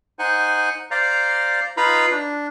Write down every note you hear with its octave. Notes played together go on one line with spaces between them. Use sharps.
D#4 C5 F#5 G#5
C5 D5 F5 A#5
D#4 F4 B4 F5 A#5 B5
D4